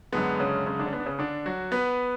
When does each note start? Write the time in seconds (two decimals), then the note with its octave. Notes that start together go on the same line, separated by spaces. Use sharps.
0.12 F#2 D3 G#3 B3
0.40 C#3 C#4
0.66 C#3 C#4
0.79 D3 D4
0.87 C#4
0.93 B3
1.00 D4
1.06 C#3 C#4
1.19 D3 D4
1.46 F#3 F#4
1.72 B3 B4